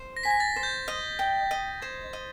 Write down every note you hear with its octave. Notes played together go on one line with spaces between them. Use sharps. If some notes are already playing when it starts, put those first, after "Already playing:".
Already playing: C5
A#6
G#5 B6
A#6
A6
C5
G6
D#5
G5
D#5
C5 G#6
D#5